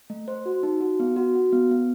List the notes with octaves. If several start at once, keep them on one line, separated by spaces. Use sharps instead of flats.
A3
C5
F#4
D#4
F#4
B3
F#4
F#4
B3
B3